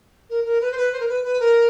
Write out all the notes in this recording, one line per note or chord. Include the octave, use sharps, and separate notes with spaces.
A#4
A#4
B4
C5
B4
C5
A#4
B4
B4
A#4